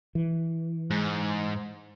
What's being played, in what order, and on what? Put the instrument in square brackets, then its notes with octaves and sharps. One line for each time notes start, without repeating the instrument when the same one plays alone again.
[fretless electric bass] E3
[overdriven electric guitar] G#2